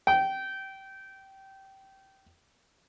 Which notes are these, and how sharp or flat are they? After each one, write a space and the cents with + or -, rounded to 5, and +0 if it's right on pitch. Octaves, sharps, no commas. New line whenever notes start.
G5 -20